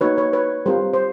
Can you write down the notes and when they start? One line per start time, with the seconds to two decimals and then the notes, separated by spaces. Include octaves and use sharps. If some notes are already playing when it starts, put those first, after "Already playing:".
0.01 A#3 D#4 F#4 B4 C#5
0.17 B4 C#5
0.33 B4 C#5
0.66 G3 C4 F4 A#4 C5
0.94 C5